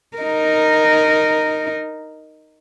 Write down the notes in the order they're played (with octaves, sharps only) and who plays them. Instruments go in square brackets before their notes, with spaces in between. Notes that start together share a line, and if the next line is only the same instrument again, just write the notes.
[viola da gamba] D#4 A#4